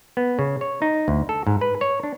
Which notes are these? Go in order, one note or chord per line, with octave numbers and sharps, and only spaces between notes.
B3
C#3
C#5
D#4
D2
A4
G#2
B4
C#5
D4